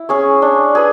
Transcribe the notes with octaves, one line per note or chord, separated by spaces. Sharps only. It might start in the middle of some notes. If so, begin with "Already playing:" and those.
Already playing: E4
C#4 G#4 C#5
D4
G#4 B4